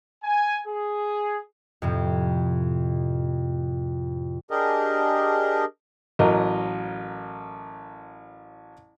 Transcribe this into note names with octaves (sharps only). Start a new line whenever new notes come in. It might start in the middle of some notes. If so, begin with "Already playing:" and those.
G#5
G#4
F2 A2 C3
D4 G4 G#4 A#4 D#5
A1 F#3 A#4 D#5